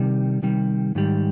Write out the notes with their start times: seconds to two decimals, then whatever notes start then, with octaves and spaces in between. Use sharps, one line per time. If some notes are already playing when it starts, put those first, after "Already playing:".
Already playing: C3 D#3 G3
0.42 C3 D#3 G3
0.95 G#2 D#3 G3